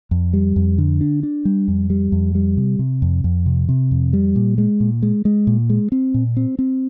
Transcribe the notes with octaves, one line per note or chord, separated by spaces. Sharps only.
F2
G3
F2
D3
D4
D4
G3
F2
G3
F2
G3
C3
C3
F2
F2
C3
C3
F2
G3
A#2
G#3
A#2
G#3
G#3
A#2
G#3
C4
A#2
C4
C4